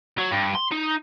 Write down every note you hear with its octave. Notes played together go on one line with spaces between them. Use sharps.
F#3
G2
C6
D#4